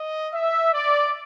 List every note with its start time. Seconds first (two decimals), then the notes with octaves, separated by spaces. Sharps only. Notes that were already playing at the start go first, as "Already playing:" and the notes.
Already playing: D#5
0.34 E5
0.74 D5